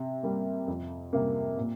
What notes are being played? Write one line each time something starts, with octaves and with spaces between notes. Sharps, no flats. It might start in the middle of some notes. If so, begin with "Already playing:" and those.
Already playing: C3
G3 A#3
F2
C3 G3 A#3
A#2